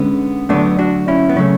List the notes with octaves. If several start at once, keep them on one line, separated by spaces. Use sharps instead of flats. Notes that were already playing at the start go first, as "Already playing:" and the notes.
Already playing: D3 G#3 B3 C#4
D3 F#3 A3 B3 D4
D4 F#4
C#4 E4
B3
C#3 F#3 A3 C#4